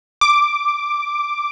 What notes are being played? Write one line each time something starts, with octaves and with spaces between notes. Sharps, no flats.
D6